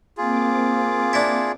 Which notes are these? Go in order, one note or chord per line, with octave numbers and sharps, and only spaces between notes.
A#3 C4 F4 G#4 D6
D4 E4